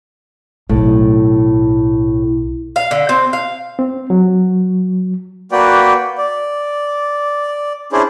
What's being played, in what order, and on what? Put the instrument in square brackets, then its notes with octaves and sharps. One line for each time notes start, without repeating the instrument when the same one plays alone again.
[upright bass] B1 [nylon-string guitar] A2
[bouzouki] F5
D3
C4
F5
[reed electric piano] C4
F#3
[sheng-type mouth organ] A#3 F#4 B4 D5 G5
D5
C#4 D4 E4 G#4 C5 D5